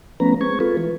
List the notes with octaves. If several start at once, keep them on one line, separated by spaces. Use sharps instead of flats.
F3 A3 B3 C#4 B4 A#5
G#3 C4 C#6 G#6
G#3 F4 A4 B4
E3